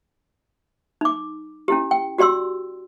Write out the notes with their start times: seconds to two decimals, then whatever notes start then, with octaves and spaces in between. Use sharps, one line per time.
1.01 D#4 D6
1.68 C#4 E4 G4
1.91 G5
2.18 F#4 G4 D5 C6 E6